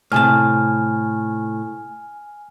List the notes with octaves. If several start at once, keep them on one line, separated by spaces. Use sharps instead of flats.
A2 C3 G#5 A5 F6